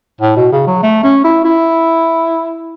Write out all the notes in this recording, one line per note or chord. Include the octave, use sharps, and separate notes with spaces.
A2
B2
C#3
F#3
A3
C#4
E4
E4